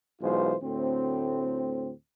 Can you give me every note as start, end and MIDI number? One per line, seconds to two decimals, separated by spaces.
0.22 0.55 35
0.22 0.55 52
0.22 0.55 56
0.22 0.55 65
0.22 0.55 72
0.63 1.91 38
0.63 1.91 45
0.63 1.91 60